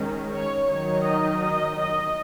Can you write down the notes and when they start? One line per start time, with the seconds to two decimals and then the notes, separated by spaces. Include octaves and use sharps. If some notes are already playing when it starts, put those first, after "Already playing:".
Already playing: D#3 G#3 C#4
0.30 C#5
0.67 D#3 F#3 D#4 C#5
1.03 D#5
1.39 D#5
1.76 D#5